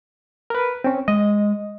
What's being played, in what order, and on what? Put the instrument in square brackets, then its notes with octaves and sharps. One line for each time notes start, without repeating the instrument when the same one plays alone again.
[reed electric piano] A#4 B4
C4 C#4
[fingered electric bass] G#3 [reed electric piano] D#5